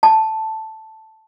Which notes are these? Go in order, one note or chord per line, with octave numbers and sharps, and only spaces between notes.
A5